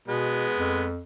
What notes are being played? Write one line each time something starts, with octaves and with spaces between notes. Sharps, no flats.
B2 G#3 B3
F2